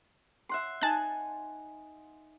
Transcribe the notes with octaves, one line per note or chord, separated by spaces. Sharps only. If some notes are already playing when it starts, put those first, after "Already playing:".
E5 F#5 C6
D#4 G#5 A5 F#6